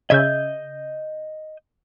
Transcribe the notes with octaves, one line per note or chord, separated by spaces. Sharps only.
C#3 D#5 E5 G6 G#6